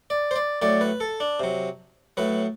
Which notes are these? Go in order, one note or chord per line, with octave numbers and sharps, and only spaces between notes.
D5
C5
D5
A2 F#3 D5
B4
A4
D4
C3 F#3
A2 F#3 B4